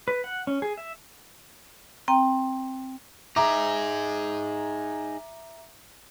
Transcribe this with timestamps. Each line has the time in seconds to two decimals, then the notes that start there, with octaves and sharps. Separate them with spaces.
0.08 B4
0.24 F#5
0.47 C#4
0.62 G#4
0.77 E5
2.08 C4 G5 A#5
3.36 D#4 G#4 E5 A#5 D6